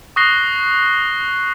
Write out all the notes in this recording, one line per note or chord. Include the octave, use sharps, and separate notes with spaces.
C#6 D#6 F#6 A#6 C7 G7